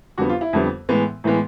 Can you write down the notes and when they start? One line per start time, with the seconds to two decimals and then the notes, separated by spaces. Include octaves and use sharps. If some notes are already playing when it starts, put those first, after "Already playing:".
0.18 F2 D3 G3 B3 F#4
0.29 F4
0.41 E4
0.53 F2 D3 G3 B3
0.89 A2 E3 G#3 B3
1.24 A2 E3 G#3 B3